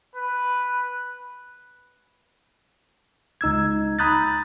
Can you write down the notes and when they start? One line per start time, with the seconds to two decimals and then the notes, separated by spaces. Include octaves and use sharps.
0.16 B4
3.41 C#2 D#4 E6 G#6
3.99 A#5 B5 D#6 F#6 G6 A6